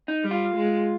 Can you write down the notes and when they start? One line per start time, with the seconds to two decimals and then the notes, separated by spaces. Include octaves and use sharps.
0.08 D#4
0.23 G3
0.31 F4
0.55 G#3